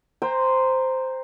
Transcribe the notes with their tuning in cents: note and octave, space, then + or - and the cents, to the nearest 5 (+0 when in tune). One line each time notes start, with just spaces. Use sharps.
C5 -5 G5 +30 A#5 +0